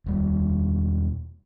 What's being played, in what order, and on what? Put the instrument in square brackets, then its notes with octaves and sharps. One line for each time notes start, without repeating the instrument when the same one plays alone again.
[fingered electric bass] E1 G3